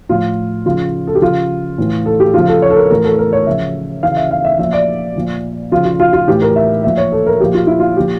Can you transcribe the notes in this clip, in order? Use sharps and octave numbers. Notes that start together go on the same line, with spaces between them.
A2 F3 F4
C#3 F3 F4
A4
G4
C#3 F3 F4
A2 E3
A4
G4
C#3 F3 F4
A4
C#5
A4
A#4
A2 E3 A#4
A4
A#4
C#5
C#3 F3 E5
C#3 E3 F5
E5
F5
E5
A#2 F3 E5
D5
A#2 F3
C#3 F3 F4
F4
F4
F4
A2 E3 G4
A#4
E5
A#2 F3 E5
C#5
A4
A#4
A#2 F3 G4
F4
E4
F4
A#2 F3 G4